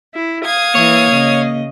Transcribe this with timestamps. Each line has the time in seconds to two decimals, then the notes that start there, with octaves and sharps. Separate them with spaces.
0.13 E4
0.44 F5 D#6 G#6
0.75 E3 A#3 C#5
1.11 C#3 D#5